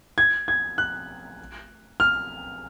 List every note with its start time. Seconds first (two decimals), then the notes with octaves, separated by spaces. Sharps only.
0.18 G#6
0.48 G#6
0.78 F#6
2.00 F6